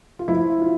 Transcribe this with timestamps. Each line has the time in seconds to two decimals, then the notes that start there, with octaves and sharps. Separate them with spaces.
0.19 F4
0.28 F3 E4
0.62 F4